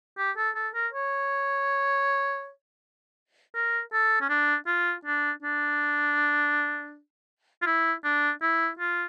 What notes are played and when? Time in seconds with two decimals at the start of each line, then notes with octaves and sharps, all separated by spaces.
0.18 G4
0.37 A4
0.55 A4
0.74 A#4
0.93 C#5
3.55 A#4
3.93 A4
4.21 C#4
4.29 D4
4.67 F4
5.05 D4
5.42 D4
7.62 F4
7.66 E4
8.04 D4
8.42 E4
8.79 F4